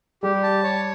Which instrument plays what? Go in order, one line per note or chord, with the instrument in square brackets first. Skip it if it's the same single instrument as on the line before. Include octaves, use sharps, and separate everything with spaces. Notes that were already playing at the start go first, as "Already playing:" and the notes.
[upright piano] G3 [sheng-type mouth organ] G4
[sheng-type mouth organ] A5
C#5